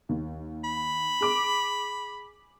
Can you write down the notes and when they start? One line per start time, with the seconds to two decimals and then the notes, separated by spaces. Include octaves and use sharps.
0.09 D#2
0.64 B5
1.21 G#4 D6